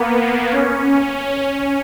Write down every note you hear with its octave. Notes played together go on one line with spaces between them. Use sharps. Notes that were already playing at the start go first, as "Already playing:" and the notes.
Already playing: A#3 B3
B3
C#4